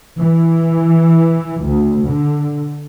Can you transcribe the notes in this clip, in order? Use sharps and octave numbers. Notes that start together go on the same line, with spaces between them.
E3
D2
D3